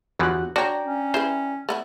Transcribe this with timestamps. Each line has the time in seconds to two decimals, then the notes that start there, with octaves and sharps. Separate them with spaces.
0.19 G1 E2 E3 F3 F#4 F#6
0.56 D4 F#4 C#5 D5 G5 A#5
0.86 C#4
1.14 E4 G#4 B4 C5
1.69 A3 B3 E4